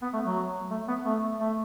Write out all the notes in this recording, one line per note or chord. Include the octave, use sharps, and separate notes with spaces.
B3
A3
F#3
A3
B3
A3
A3